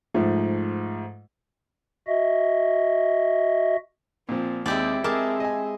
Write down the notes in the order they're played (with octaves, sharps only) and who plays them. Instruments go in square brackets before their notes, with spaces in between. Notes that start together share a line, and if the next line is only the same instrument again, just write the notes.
[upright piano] G#2 F3 A3
[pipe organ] F#4 D#5 E5
[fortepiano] A#2 F3 [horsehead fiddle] C4
[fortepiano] D#2 [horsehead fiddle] G#3 C4 [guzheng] E4 G4 D5
[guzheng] G#3 A5 [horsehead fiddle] C4 E5 [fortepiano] A#4 D6
[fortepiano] D#5 G#5